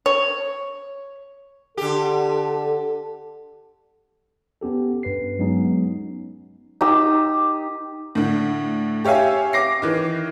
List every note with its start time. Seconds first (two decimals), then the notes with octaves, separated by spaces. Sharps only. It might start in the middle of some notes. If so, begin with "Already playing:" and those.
0.06 C#5
1.77 D3 G4 A4
4.61 B3 C#4 G4 A4
5.03 G2 B4 C7
5.39 F#3 G#3 B3 C#4 D#4
6.81 D#4 G4 E6
8.15 A2 D3
9.04 G4 C#5 E5 F5 G#5
9.53 D6 A#6 C7
9.82 D#3 E3